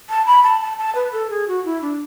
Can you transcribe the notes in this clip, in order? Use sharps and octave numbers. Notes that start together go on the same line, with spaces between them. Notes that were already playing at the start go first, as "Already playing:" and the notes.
A5
B5
A5
A5
A5
B4
A4
G#4
F#4
E4
D4